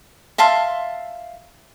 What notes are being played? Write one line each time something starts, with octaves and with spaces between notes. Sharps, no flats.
E5 F5 A5 C6